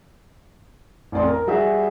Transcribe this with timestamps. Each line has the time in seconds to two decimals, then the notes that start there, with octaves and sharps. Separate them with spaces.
1.12 A1 F2 D5 C6
1.27 A#4
1.47 G3 F#4 G#4 E5